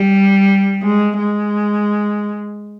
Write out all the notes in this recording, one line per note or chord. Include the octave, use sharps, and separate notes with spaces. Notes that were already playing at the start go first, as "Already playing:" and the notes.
Already playing: G3
G#3
G#3